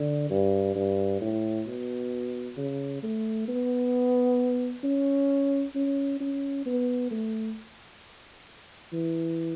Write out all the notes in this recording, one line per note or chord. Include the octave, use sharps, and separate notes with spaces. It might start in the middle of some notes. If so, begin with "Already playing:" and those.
Already playing: D3
G2
G2
A2
B2
C#3
A3
B3
C#4
C#4
C#4
B3
A3
E3